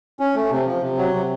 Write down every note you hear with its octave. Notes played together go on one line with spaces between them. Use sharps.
C#4
A3
C3
F3
C3
F#3
C3